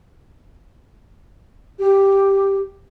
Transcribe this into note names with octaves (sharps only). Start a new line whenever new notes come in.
G4